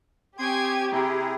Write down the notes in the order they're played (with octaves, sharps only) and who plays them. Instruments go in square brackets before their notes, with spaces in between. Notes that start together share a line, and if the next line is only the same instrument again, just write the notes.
[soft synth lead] C4 [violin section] G4 [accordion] G5 C6 D#6 [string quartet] G#5 C#6 G#6
[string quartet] C3 [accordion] E4 G#4 [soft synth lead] A#5